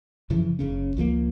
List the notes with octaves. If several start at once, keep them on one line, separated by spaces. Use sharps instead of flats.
F#2 C#3 E3 F3
F#1 C#3 C#4
C#2 F3 G3 A#3